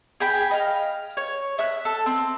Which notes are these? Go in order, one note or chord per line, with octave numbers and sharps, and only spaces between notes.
G#4 G5 B5
D#5 F5
C#5
E5 F#6
A4
C4